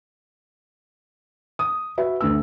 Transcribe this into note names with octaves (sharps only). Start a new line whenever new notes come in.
D#6
F#4 B4 E5
D2 A3 E6